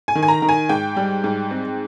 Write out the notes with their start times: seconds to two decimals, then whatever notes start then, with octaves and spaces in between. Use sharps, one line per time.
0.08 G#5
0.15 D#3
0.23 G#5
0.28 A#5
0.42 D#3
0.49 G#5
0.69 G#2 G5
0.96 G3
1.24 G#2
1.51 C4